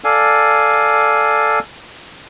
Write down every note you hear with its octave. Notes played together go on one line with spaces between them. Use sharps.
A4 D5 F5 G#5